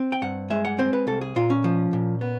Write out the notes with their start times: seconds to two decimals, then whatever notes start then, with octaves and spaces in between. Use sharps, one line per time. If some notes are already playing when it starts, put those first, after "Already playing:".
Already playing: C4
0.12 G5
0.22 G2 F#5
0.50 G#3 E5
0.65 F#5
0.78 C4 C5
0.93 B4
1.07 C2 A4
1.21 G#4
1.36 A#2 F4
1.50 C#4
1.64 F3
1.93 A#2
2.21 B3